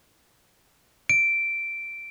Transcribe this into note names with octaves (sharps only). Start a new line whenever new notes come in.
D7